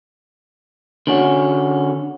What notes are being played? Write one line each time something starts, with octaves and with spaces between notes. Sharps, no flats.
D3 C#4 F#4